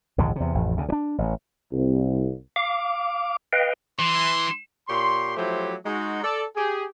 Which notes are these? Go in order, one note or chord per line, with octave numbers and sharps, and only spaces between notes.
A#1 D#2 G#2 D3
E2 C3
A1 F2
D2 C#3
E3 D4
A1
C2
F5 D6
B4 D#5 F5 G5
E3 C6
A#2 G4 C#5 C6
F3 F#3 A3 E4 G4 C5
G#3 D#4 F#4
A4 D5
G4 G#4